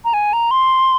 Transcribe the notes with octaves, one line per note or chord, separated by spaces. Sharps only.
A#5
G#5
A#5
C6